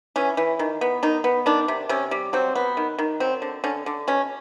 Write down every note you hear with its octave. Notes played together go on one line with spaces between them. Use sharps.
E3 C#4
E3
D#3
B3
D#3 D#4
B3
D#3 D4
C3
C3 C#4
G3
F#3 C4
B3
D#3
D#3
F#3 C4
D3
D3 C#4
D3
B2 C#4